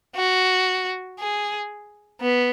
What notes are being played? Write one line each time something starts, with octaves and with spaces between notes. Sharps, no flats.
F#4
G#4
B3